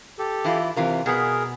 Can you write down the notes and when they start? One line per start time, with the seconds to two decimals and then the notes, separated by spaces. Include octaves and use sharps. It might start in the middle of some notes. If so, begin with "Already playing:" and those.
0.19 G4 A4
0.44 E3 E4 F4
0.76 C3 E3 F4 A#4
1.06 B2 B3 G#4 A#4